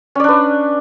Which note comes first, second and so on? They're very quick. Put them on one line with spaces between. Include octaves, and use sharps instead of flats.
C#4 D5 D4 B4